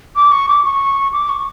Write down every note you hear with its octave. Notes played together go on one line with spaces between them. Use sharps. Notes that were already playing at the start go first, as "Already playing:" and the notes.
D6
C#6
D6
C#6
D6
C#6